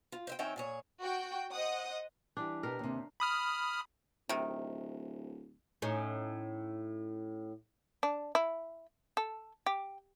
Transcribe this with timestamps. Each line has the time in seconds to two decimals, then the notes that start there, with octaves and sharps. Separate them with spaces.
0.12 F4
0.27 C5 E5 G5
0.39 D#3 C4 C#4 C#5 E5 G5
0.56 A#2 G#4 C#5
1.00 F#4 G5
1.52 C5 D#5 F#5 D#6
2.37 E3 G3 D4 G4
2.63 B2 G4 A#4
2.79 D#2 C3
3.20 B5 D#6 F6
4.29 D1 C3 D#3
5.82 A2 C#4 D#4
8.03 D4
8.35 E4
9.17 A4
9.66 G4